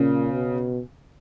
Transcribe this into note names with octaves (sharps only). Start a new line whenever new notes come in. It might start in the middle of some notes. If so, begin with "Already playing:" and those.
Already playing: A#2 C#3
B2